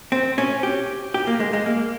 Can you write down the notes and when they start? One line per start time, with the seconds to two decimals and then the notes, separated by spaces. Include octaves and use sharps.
0.12 C4
0.38 C#4
0.63 G4
1.14 G4
1.27 A#3
1.40 G#3
1.53 G#3
1.66 A#3